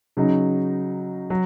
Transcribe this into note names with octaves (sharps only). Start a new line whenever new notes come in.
C#3 F#3 D#4
F#3